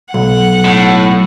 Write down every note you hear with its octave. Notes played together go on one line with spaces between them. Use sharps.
B1 F#5
A2